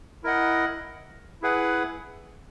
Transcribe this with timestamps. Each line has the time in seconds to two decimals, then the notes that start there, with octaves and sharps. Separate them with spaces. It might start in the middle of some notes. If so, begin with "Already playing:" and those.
0.24 E4 A#4 D#5 F#5
1.42 E4 G#4 B4 F#5